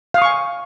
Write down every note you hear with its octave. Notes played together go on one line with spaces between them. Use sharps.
F5 G#5 C#6 D#6